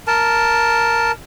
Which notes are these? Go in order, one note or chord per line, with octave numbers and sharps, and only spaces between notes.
A#4 A5